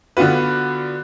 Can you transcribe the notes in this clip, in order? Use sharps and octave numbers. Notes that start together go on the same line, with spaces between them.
D3 B3 F4 F#4 B4